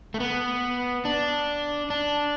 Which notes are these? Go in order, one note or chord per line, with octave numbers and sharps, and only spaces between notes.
A3
B3
D4
D4